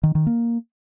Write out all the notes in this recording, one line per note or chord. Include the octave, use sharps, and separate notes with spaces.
D#3
D#3
A#3